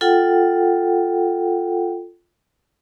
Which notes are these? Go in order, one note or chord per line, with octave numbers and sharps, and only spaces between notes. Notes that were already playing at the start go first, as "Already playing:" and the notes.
F4 A4 F#5 G5